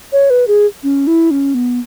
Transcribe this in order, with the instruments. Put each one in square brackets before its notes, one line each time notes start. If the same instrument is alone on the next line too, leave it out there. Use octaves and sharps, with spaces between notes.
[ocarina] C#5
B4
G#4
C#4
E4
C#4
B3